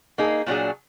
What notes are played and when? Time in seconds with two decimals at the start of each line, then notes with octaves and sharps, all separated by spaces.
0.18 A#3 D#4 G#4
0.46 A#2 F#3 D4 G#4